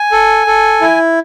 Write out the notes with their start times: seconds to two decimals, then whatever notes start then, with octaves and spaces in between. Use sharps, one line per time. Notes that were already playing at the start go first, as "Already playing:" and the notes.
Already playing: G#5
0.12 A4
0.47 A4
0.81 E4